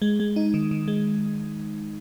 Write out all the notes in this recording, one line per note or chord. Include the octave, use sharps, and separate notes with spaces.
G#3
G#3
D#4
D#3
D#3
G#3